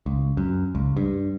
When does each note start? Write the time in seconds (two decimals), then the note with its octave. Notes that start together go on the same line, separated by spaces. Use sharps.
0.06 C#2
0.37 F#2
0.75 C#2
0.97 G2